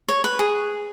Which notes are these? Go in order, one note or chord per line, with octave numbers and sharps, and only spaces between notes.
C#5
B4
G#4